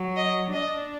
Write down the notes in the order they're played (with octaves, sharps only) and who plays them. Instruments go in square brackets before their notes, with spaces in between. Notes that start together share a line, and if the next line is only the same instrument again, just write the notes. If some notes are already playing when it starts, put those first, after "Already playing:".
Already playing: [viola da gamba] F#3
[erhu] D#5
[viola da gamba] D4 [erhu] D#5